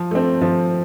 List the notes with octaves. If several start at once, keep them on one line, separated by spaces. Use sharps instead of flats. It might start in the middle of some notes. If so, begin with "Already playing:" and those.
Already playing: F3
A3 C4
F3